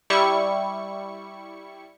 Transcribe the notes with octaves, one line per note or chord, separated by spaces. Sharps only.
G3 E4 C#6 C#7